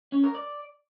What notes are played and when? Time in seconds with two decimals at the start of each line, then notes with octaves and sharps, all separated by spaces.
0.12 C#4
0.23 A#4
0.35 D5